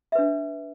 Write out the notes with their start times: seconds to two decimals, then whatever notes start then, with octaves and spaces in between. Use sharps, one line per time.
0.12 E5
0.15 B4
0.19 D4